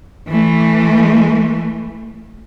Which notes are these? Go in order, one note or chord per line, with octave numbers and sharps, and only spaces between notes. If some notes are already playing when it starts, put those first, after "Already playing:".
E3 A3